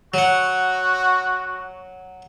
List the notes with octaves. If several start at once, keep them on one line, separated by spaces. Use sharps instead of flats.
F#3 F#4 F#5